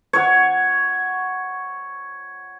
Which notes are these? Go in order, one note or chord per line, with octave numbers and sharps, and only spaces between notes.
C#5 F#5